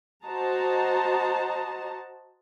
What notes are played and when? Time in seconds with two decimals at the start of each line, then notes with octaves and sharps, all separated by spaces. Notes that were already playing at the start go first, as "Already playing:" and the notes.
0.25 F#4 C5 D#5 A5 A#5